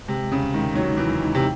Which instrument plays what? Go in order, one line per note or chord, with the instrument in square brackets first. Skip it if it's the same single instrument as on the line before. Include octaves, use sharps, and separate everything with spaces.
[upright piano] C3 [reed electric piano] G#3
[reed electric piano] D#2 [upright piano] C#3
[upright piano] D#3 [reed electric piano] G#3
[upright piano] F#3 [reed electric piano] D#4
[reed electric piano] D#2 [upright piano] E3
[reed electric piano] D#4
[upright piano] C3